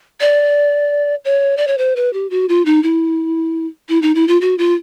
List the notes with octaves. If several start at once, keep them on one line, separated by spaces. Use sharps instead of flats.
D5
C#5
D5
C#5
C5
B4
G4
F#4
F4
D#4
E4
E4
D#4
E4
F4
F#4
F4